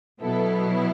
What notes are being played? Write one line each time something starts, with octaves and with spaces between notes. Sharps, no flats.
B2 F#3 B3 E4 A4